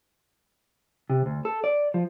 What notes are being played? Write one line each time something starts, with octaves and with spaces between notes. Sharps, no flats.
C3
D2
A4
D5
F3